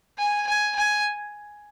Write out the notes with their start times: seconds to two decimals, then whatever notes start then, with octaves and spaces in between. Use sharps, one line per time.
0.18 G#5
0.47 G#5
0.76 G#5